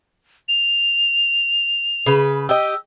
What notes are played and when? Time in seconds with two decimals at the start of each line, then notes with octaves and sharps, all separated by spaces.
0.48 F7
2.06 C#3 B4
2.49 G4 D#5 E6